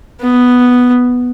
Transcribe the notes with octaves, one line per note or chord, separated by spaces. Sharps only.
B3